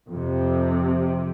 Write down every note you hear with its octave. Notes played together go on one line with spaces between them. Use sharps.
F2 C3